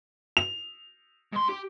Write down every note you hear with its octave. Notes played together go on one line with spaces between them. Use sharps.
F7
G#2 C6
G4